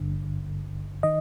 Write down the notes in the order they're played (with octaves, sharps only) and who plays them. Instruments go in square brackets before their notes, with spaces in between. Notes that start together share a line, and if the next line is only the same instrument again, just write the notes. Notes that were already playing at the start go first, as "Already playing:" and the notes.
Already playing: [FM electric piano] G#1 G2 D3
D#3 D#5